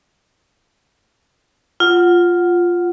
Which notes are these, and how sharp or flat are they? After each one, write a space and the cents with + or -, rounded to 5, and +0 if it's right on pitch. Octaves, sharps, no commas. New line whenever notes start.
F4 +0 F#5 +0